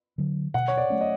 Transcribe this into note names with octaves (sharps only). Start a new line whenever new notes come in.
D3 F#3
B2 F#5
C#5
D5
F#3 A3 C#4
D#5